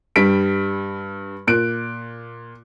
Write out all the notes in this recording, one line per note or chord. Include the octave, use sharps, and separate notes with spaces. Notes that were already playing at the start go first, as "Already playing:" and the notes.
G2 G3 B6 D7
A#2 F#6 D7